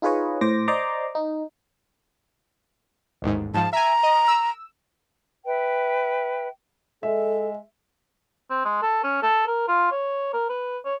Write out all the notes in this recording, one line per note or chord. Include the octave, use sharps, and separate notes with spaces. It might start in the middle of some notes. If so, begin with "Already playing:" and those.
D#4 F4 G#4 B4 C#5 D#5
A2 C5 D6 A#6
C5 D5 D#5 A#5 C6 D6
D#4
A1 D#2 G#2
G#2 F3 A5
E5 G#5 A#5
D#5
E6
B4 E5 G5
G#3 A4 E5
C4
G#3
A4
C#4
A4
A#4
F4
C#5
A#4
B4
C#5